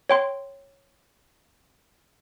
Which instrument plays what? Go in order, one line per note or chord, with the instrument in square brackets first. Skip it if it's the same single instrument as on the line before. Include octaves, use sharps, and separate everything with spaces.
[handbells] C#5 G5 C6